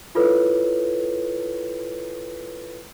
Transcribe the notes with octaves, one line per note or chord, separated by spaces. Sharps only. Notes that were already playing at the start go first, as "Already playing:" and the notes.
E4 F4 A4 B4 C#5